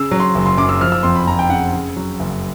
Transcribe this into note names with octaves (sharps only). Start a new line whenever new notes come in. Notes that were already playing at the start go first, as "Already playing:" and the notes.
Already playing: C#3 E6
F#3
C6
F#1
C6
F#2 D6
E6
F3 F6
E6
F2 C6
B5
F2 A#5
G5
C#3 F#5
C#3
F#3
F#1